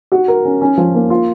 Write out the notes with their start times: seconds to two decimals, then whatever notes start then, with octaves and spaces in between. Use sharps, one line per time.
0.12 F#4
0.28 A#4
0.45 C#4
0.61 C#4
0.78 F3
0.95 A#3
1.10 F4